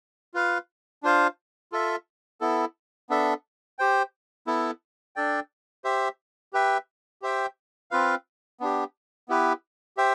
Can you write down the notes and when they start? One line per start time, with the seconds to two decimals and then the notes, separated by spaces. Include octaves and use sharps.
0.34 F4 B4 F5
1.03 D4 F4 C5 F5
1.72 F4 A4 E5
2.41 B3 E4 A4
3.10 B3 D4 A4 E5
3.79 G4 C5 G5
4.47 B3 E4 A4
5.16 D4 A4 D5 G5
5.84 G4 C5 E5
6.53 G4 B4 E5 G5
7.22 G4 C5 E5 G5
7.91 C4 F4 B4 F5
8.60 B3 D4 G4
9.29 B3 E4 G4 B4
9.97 G4 C5 E5 G5